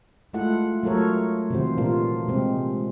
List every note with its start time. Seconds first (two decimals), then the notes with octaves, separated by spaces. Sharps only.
0.33 G#3 A3 E4 F4 A4 F#5
0.83 F#3 A3 F4 A4 A#4 C#5
1.50 C3 D#3 E3 F#4 C5
1.77 A#2 A#3 D4 F4 A#4
2.28 C3 G#3 C4